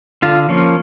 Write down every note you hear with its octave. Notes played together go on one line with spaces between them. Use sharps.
D3 F4
F3 A#3 C#4